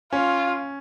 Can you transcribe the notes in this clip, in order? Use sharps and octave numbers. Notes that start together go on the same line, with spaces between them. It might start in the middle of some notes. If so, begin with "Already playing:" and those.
C#4 F4